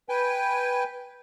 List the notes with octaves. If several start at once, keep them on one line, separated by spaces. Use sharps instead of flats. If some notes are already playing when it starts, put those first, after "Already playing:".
B4 G5 G#5